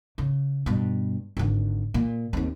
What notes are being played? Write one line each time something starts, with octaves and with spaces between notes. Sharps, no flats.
C#3
G2 B2
G#1 D3
A#2
D#2 C4